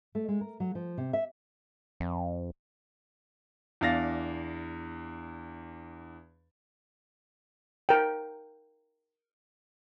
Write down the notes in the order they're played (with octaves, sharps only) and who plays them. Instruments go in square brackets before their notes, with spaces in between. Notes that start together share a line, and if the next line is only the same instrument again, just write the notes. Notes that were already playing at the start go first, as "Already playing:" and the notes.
[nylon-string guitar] A3
G#3
A#4
F#3
F3
C3
E5
[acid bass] F2
[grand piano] E2 D4 F5 A6 A#6
[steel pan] A#4 G5